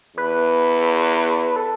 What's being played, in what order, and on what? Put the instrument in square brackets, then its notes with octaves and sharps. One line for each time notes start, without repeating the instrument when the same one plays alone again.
[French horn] E2 [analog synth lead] B4
[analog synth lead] A4